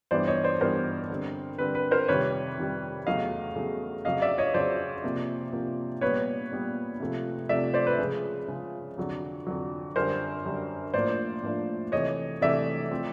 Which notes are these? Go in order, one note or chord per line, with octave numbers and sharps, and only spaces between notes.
G2 E3 G3 B3 D4 C5 D5
C#5 D#5
C5 D5
G2 E3 G3 B3 D4 A#4 C5
D3 G3 C4
D3 G3 C4 B4
B4
A#4 C5
F2 C3 D#3 G3 B4 C#5
F2 C3 D#3 G3
E2 C#3 F#3 A3 D#5 F5
E2 C#3 F#3 A3
F2 C#3 F#3 D#5 F5
D5 E5
C#5 D#5
F2 C#3 F#3 C5 D5
C3 F3 A#3
C3 F3 A#3
A#2 G3 B3 B4 C#5
A#2 G3 B3
C3 F3 A3
C3 F3 A3 D5 E5
C5 D5
B4
C#3 F3 G#3
C#3 F3 G#3
F2 D3 F#3
F2 D3 F#3
F#2 D3 G3 A#4 C5
F#2 D3 G3
A2 F3 A#3 D4 C5 D5
A2 F3 A#3 D4
C3 E3 A3 C#5 D#5
C3 E3 A3 D5 E5
F3 A3 C4